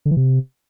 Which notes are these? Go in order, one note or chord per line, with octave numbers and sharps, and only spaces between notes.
D3
E3
C3